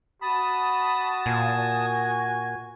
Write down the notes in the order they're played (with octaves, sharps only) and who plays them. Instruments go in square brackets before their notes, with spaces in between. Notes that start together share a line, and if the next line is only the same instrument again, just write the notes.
[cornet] F#4 [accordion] A5 D#6 [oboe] B5
[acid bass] A#2 [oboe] G#5